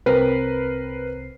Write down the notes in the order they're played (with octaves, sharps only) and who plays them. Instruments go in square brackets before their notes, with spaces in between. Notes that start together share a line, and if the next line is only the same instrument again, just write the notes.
[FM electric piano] C2 C4 C7 [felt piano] A#4 B4